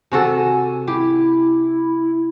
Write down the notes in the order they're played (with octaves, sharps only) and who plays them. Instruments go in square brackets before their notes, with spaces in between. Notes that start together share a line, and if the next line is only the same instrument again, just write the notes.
[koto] C3 F#4 A4 [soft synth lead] G#5
[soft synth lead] E4 [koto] G4